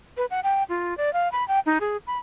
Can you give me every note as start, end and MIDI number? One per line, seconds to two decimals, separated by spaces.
0.17 0.26 71
0.31 0.40 78
0.43 0.63 79
0.69 0.97 65
0.98 1.13 74
1.13 1.31 77
1.32 1.46 83
1.48 1.60 79
1.66 1.78 63
1.81 1.97 68
2.07 2.18 83